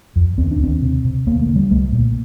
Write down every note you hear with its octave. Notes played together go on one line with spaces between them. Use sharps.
F2
D#2 C4
D4
D#2 C4
C3
C3
D#2 A#3
A3
D3
G3
C2 A3
A#2